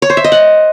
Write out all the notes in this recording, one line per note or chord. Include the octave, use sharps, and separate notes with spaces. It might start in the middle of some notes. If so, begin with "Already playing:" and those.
C#5
C5
E5
D#5
F#5